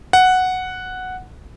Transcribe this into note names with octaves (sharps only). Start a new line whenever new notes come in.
F#5